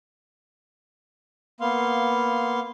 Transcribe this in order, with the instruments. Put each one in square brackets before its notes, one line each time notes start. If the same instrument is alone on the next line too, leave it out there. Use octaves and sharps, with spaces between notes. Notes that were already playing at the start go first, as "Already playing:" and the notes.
[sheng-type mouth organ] A#3 B3 F5 C6